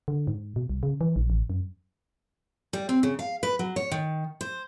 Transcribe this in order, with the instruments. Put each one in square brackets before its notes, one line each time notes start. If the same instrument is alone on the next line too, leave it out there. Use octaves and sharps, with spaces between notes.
[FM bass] D3
G#2
B2
C2
C#3
E3
A#1
A1
F#2
[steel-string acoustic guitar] G3
C4
C#3
F5
B4
F#3
C#5
D#3
C5